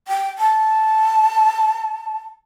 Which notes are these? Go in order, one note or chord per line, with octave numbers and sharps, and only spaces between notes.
G5
A5